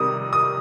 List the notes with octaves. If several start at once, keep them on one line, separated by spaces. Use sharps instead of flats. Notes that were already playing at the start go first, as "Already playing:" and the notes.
Already playing: C3 D#3 G3 D#6
D#6